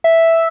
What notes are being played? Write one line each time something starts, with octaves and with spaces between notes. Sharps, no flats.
E5